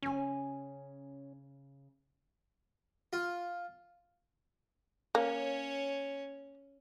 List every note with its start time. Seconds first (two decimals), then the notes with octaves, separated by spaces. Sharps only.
0.03 C#3 C#4 G#5
3.13 F4
5.15 A#3 C#4 C#5